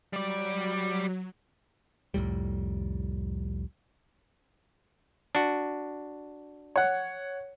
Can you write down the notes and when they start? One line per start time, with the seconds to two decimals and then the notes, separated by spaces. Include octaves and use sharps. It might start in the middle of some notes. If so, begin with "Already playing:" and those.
0.13 F#3 G3 D5
2.14 C2 F2 A2 G3
5.35 D4 F#4
6.76 C#5 F#5